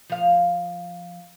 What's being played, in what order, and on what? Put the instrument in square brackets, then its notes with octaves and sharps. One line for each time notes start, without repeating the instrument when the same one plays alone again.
[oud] F3 F5